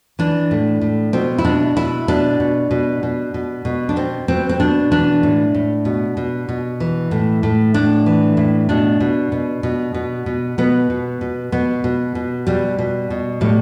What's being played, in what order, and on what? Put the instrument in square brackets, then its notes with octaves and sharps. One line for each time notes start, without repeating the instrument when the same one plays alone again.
[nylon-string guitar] E3 D4
A2
A2
B2 C4
E4
B2 D4
B2 E4
B2 D4
B2
B2
B2
B2
B2
D4
B2 C4
B2 C4
C4
B2 D4
E3 D4
A2
A2
B2
B2
B2
E3
A2
A2
A2 D4
E3
A2
B2 D4
B2
B2
B2
B2
B2
B2 B3
B2
B2
B2 B3
B2
B2
B2 G3
B2
B2
A2 G3